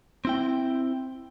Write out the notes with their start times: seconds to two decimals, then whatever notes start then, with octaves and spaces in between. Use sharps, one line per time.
0.25 C4 E4 G5